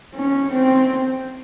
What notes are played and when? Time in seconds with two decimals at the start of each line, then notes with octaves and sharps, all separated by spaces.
0.15 C#4
0.53 C4